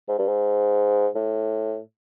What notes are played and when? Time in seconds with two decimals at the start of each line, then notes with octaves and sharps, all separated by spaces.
0.08 G#2
0.18 G2
0.27 G#2
1.15 A2